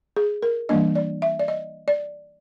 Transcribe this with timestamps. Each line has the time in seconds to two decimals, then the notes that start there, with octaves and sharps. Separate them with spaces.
0.16 G#4
0.42 A#4
0.69 E3 G3 A#3 D4 D#5
0.95 D5
1.22 E5
1.39 D5
1.48 D#5
1.88 D5